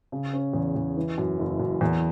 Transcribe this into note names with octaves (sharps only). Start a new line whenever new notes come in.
C#3
C#4
E2
E2
E3
F#2
F#1
F#2
E2